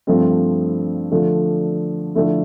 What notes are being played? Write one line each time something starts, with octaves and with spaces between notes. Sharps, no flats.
G2 F3 A3 C4
D3 F3 A3 D4
D3 F3 A3 E4